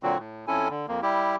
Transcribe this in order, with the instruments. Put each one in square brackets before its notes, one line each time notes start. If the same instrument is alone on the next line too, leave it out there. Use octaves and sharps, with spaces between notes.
[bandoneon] A#2 D3 F#3 C4 F#4
A2
F2 C#4 E4 A4 G#5
D3
F2 A#3
G3 E4 G4